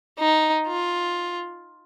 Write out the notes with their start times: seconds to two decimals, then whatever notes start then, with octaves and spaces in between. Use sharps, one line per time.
0.19 D#4
0.67 F4